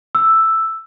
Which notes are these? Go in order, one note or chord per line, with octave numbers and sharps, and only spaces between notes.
E6